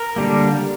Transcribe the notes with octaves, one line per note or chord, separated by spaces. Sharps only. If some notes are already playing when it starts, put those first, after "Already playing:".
Already playing: A#4
D3 G3 A#3